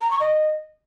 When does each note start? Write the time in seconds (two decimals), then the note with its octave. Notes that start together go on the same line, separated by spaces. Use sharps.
0.01 A#5
0.11 C#6
0.20 D#5